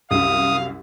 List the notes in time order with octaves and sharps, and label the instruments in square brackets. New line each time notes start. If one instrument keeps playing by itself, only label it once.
[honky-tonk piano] C2 F#2 [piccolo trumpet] F5 [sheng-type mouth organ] D#6